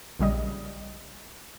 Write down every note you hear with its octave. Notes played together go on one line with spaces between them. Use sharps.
A#1 C#3 G3 D#5